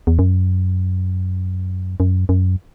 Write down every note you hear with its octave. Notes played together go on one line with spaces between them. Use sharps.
E2
F#2
F#2
F#2